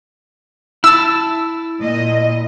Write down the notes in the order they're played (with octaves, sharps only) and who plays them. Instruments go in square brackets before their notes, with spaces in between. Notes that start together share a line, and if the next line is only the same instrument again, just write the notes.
[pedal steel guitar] E4 A5 [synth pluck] E6
[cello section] A#2 D#5